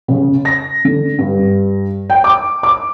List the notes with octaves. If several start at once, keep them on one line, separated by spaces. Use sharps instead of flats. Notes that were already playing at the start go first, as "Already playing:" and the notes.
C#3
A#6
D3
G2
G5
D6
D6